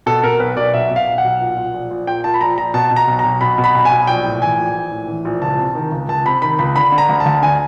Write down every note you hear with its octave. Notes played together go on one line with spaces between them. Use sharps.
B2 A4
B2 A#4
B1 B4
B1 D5
B2 E5
B2
F5
B1
F#5
B1
A#2
A#2
A#1
A#1
A#2 G5
A#2 A5
B5
A#1 A#5
A#1 A#5
B2 A5
B2
A#5
B1
A#5
B1
B2 B5
B2
B5
B1
G#5
B1
A#1 G5
A2
E3 G#5
A#1
A#1
A2
E3
A#1
C#2 A5
C3
D#3
C#2
C#2 A5
C3 B5
D#3 B5
C#2 B5
D3 B5
D3
A#5
D2
A5
D2
D3 G#5